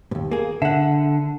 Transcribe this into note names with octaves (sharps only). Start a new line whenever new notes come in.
D#2 G#2
A#3 G#4
D3 E5 F#5